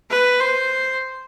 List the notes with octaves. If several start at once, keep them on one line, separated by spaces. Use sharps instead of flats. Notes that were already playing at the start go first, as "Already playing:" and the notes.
B4
C5